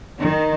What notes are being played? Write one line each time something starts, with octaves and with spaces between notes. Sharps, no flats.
D#3